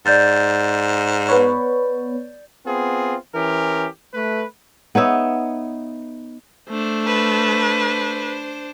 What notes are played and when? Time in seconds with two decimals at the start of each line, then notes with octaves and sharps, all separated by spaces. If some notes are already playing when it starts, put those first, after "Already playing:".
0.06 G#2 D5 G6 A6
1.29 B3 B4 C#5
2.66 B3 C4 F4 G#4
3.33 E3 C#4 G4 A#4
4.14 A3 B4
4.95 B3 D#4 C#5 E5
6.69 A3 D4 C5
7.07 B4